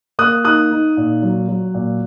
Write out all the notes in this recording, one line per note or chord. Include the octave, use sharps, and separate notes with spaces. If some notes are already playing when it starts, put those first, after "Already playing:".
A#3 D#6 F#6
D#4 D#6 F#6
D#4
A#2
F#3
F#3
A#2